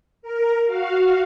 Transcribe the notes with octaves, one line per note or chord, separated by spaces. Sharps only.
A#4
F#4 F5